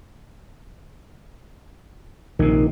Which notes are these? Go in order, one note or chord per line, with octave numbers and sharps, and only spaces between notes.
A#1 C3 D#3